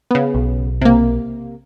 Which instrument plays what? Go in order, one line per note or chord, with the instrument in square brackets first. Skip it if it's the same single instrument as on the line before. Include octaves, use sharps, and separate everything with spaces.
[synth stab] C#3 B3
[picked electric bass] B1
[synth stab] C3 A#3